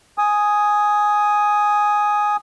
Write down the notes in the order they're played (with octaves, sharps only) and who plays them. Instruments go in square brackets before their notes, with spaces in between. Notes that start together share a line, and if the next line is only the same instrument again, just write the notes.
[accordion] G#5 D#6